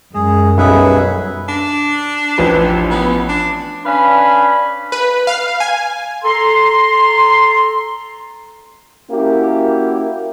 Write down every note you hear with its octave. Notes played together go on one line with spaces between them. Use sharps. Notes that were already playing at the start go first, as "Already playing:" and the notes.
F#2 G#3 G#4
B1 G3 C#4 G#4 B4 E5
D4
A1 F3 B4
B3
D4
C#4 D4 B4 F5 B5
B4
F5
G#5
A4 A#5 C6
A#3 C#4 E4 F#4 G4 A#4